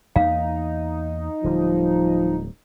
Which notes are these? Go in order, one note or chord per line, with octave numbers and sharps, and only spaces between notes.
E2 A#3 D#4 F5
D1 D3 F3 G3